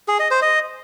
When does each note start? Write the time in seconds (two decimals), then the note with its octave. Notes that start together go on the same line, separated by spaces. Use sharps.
0.08 G#4
0.19 D#5
0.31 C5
0.42 D#5